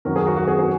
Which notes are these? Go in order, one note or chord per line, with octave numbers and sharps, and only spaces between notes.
F#2 D#3 F#3 A#4
G#4
F#4
F#4
G#4
G#4